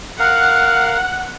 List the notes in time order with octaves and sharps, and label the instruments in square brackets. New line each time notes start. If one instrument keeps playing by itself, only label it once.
[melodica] A#4 F5 [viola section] F#5